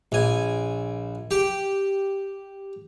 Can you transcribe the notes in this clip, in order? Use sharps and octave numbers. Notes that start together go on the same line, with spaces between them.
A#1 G#5
G4